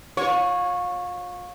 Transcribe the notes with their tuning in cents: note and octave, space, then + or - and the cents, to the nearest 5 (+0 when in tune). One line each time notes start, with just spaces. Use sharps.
F4 +35 C#5 -10